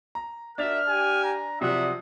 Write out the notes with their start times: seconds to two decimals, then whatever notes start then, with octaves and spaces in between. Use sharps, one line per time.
0.15 A#5
0.58 D4 F#4 A#4 E5 F6 A6 F7
0.87 G4 G#5
1.24 A#5
1.61 C3 F3 F#3 D5 E5 F#5 D#6